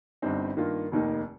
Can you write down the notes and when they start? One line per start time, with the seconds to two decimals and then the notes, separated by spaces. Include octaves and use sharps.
0.22 G1 G2 G3 C4 D#4
0.57 G2 D#3 A#3 F4
0.92 F1 D#2 D#3 A#3 D#4